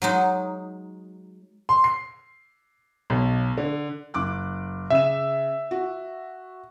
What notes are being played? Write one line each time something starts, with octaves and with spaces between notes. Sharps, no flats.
F#3 G#3 D#4
C6
C7
B1
D3
F#1 D6 F#6
C#3 E5 E7
F#4